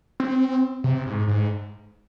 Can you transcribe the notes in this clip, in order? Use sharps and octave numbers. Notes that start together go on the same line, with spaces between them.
C4
C3
G#2
G#2